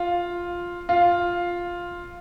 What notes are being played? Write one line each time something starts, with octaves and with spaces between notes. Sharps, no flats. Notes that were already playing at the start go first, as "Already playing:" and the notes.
Already playing: F4
F4